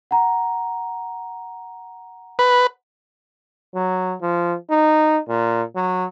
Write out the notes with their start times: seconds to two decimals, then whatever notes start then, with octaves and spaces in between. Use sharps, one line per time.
0.11 F#5 A#5
2.39 B4
3.75 F#3
4.21 F3
4.70 D#4
5.29 A#2
5.76 F#3